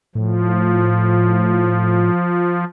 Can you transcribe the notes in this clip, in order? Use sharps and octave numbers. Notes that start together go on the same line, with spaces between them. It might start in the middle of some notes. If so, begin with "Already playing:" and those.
A2 F3